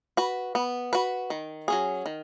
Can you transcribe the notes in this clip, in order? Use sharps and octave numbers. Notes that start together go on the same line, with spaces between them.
F#4 B4
B3
F#4 B4
D#3
F#3 C#4 G#4
D#3